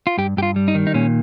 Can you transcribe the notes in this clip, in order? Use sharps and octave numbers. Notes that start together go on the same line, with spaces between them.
F4
G2 G4
G2 G4
F4
G3
D#4
D#3
D#4
A#2 C#4